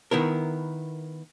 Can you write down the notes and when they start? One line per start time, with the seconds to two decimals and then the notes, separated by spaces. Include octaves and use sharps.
0.11 D#3 B3 E4 A#4